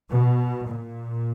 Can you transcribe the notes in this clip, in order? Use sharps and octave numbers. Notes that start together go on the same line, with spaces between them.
B2
A#2